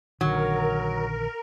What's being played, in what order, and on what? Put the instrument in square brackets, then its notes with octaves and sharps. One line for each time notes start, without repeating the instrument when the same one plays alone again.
[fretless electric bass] A#1 D3 D#3 [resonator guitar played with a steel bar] F#3 [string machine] A#4